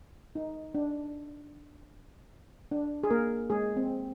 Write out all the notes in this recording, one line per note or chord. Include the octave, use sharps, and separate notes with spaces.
D#4
D4
D4
G#4
A#3 A#4
G#3 G#4
C4